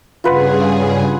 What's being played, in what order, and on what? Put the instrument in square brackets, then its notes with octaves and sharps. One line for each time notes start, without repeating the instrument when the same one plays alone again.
[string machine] G2 C#3 G#4 [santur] F4 B4 F#5